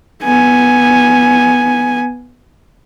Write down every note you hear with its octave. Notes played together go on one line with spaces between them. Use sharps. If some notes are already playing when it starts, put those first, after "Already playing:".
B3 G#5